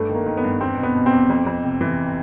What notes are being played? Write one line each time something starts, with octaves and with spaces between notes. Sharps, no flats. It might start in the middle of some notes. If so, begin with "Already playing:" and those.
Already playing: G2 A3
D#3 A#3
D#3
B3
G2
E2 C4
B2
B3
B2
C4
E2
F2
F2
C3
E3